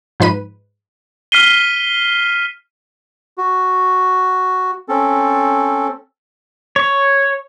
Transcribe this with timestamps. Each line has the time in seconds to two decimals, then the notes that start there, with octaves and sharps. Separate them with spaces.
0.20 G#2 F3 D#4 B4 B5 D#7
1.32 F6 B6 C7 D#7 G7
3.38 F#4
4.89 C4 C#4 A4
6.76 C#5